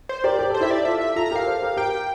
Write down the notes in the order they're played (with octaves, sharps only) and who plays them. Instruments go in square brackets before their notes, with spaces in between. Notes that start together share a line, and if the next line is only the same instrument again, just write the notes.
[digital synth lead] C5
[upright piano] G4 A#4 [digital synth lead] D5
[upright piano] G4
[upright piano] A4 [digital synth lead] C5
[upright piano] E4 G4 [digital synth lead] E5
[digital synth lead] D5
[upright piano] F4 A4 [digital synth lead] E5
[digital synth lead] E5
[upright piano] F4 A4 [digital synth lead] A#5
[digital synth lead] A#5
[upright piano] G4 A#4 [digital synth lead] F5
[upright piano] A4 C5
G4 A#4
[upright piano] G4 A#4 [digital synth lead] G5